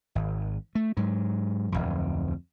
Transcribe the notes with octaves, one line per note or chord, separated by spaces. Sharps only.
G#1
A3
G#2 F#3
D1 G1 F2